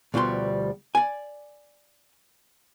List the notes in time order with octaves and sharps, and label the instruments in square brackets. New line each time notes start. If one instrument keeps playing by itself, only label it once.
[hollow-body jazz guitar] D2 B2 F3 G3 C6
D5 G#5